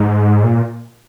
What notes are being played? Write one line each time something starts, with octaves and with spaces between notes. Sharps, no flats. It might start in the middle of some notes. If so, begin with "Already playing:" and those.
Already playing: G#2
A#2